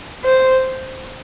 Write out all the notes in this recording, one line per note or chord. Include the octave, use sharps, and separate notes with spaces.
C5